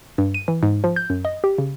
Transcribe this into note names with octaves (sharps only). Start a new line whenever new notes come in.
G2
D#7
E3
G#2
F3
G6
F#2
D#5
G4
C#3